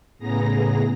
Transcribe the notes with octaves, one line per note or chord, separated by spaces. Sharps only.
A2 C#3 B3 G#4 A#5 A#6